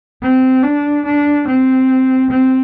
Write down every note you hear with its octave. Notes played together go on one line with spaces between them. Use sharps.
C4
D4
D4
C4
C4